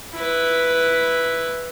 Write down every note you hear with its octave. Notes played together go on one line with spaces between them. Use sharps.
E4 B4